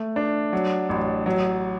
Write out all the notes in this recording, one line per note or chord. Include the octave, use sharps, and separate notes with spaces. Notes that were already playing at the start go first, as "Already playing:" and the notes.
Already playing: A3
D4
F#3
A1
F#3